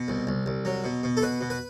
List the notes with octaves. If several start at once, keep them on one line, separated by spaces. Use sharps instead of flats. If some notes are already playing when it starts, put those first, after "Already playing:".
Already playing: B2
C2
C2
C2
F#3
B2
B2
A4
B2 B4
B2
B4